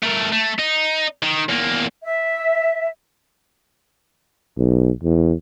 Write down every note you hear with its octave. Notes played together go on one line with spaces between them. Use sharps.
A3 A#4
A3
D#4
D#3
E2 A#3
E5
B1
E2